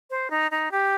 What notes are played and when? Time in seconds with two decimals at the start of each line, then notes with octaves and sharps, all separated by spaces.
0.10 C5
0.30 D#4
0.51 D#4
0.71 G4